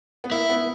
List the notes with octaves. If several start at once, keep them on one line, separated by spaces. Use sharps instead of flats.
B3
A#3 E4
B3